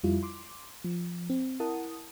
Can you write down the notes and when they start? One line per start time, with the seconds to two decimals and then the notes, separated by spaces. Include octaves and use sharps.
0.04 F2 G3 E4 F4
0.23 C6 D6
0.84 F3
1.30 C4
1.60 E4 A#4 F#5 A5 D#6